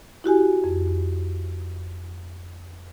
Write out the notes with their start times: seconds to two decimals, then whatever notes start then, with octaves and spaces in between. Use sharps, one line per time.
0.24 E4 F#4 G4 G#5
0.64 F2